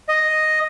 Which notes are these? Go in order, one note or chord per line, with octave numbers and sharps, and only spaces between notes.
D#5